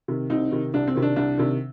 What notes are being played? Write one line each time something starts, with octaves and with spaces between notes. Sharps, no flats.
C3 D#3
C2 C4 D#4
C3 D#3
C2 D4
C4
C3 D#3
D4
C2 D4
C3 D#3